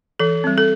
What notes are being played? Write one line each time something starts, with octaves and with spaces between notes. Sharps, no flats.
E3 A4
G3 C4
A4